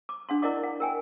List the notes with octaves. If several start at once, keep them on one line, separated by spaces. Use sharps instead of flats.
D6
D4 F#5 C6
E4 A#4 D5 D#5 F#5 D6
F#5
A#4 G5 G#5